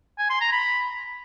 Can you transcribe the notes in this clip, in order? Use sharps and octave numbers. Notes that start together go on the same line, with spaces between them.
G#5
C6
A#5
B5